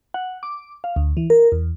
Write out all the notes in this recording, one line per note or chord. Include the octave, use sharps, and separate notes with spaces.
F#5
D6
F5
D2
E3
A#4
E2